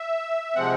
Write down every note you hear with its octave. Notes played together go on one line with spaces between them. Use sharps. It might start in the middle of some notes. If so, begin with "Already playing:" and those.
Already playing: E5
C3 F3 G#3 C4 F#5